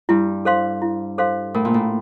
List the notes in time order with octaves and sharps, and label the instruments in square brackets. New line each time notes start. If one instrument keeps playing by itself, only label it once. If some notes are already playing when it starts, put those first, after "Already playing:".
[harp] G2 [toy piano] E4
[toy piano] A4 C5 F5 C6
E4
A4 C5 F5 C6
[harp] A2 [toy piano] A#4
[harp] A#2
A2